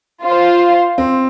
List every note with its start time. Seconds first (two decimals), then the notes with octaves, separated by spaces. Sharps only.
0.23 F4 C5 F5
0.98 C4